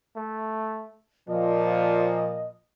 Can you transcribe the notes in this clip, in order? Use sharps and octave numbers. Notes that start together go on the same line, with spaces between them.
A3
A#2 F3 D#5